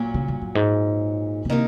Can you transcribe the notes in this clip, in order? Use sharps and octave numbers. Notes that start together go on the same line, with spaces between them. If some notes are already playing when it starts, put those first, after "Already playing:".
Already playing: A#2 F#3 C#4
C#3
F#2
F#2
G#2
C#3
C3 D#3 A#3 D#4